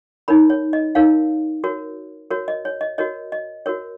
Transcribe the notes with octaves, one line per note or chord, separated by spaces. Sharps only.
D#4 A#4 C#5 B5
C#5
D#5
D#4 A#4 C#5 F5
F#4 A#4 C#5
F#4 A#4 C#5
D#5
C#5
D#5
F#4 A#4 C#5 D#5
D#5
F#4 A#4 C#5